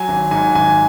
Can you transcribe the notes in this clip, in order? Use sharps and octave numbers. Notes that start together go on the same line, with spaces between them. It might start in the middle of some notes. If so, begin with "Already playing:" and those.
Already playing: F#3 G#5
G#1
G#2 G#5
G#1 G#5